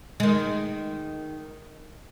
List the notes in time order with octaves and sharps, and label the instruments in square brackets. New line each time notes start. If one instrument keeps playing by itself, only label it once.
[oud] D#3 G#3